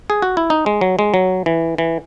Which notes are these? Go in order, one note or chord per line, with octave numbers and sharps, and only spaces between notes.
G#4
F#4
E4
D#4
G#3
F#3
G#3
F#3
E3
E3